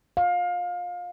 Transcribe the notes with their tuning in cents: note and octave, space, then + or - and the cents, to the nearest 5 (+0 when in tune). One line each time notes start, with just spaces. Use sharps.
F5 +25